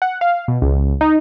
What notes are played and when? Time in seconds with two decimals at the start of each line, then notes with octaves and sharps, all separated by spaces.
0.02 F#5
0.21 F5
0.48 B2
0.62 C#2
1.01 D#4